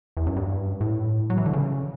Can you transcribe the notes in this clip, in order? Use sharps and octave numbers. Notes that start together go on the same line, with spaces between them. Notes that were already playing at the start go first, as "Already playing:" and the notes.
E2
F#2
G2
A2
F#3
E3
D3
C#3